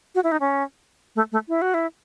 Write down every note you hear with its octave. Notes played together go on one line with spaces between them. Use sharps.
F#4
E4
D#4
C#4
A3
A3
E4
F#4
E4